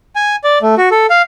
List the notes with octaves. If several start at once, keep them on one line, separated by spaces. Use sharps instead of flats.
G#5
D5
A3
F#4
A4
F5